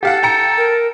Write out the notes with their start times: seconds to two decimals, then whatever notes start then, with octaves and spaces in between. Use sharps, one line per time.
0.03 G4 A4 F5 F#5
0.23 G5 A#5 C#7
0.58 A#4